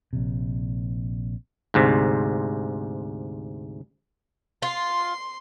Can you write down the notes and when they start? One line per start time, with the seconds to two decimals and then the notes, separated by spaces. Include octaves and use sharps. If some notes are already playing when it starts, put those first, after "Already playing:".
0.13 A#1 C3
1.74 D2 G#2 C3
4.62 F4 C6